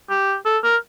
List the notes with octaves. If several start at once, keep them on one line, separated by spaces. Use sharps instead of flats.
G4
A4
A#4